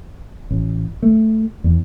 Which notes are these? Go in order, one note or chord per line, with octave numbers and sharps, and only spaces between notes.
A1
A3
E2